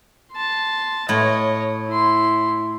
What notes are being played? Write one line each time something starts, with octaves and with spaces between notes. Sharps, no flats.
A5 C6
A2 C#5 D#5
E4 C6